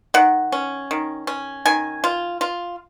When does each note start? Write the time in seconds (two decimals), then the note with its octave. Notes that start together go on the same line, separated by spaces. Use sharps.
0.14 D#3 F#5
0.52 C#4
0.91 D#3
1.27 C#4
1.65 D#3 G#5
2.04 F4
2.41 F4